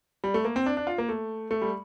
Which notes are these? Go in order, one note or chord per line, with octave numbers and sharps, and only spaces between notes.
G3
A3
A#3
C4
D4
D4
F4
A#3
A3
A3
G3